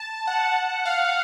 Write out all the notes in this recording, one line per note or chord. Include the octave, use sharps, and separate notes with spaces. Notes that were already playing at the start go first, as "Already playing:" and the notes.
Already playing: A5
F#5
F5